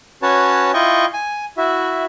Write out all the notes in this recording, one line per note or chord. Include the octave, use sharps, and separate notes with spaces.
C#4 F#4 B4 C#5 A5
E4 F4 D#5 G5 C#6
G#5
E4 F#4 E5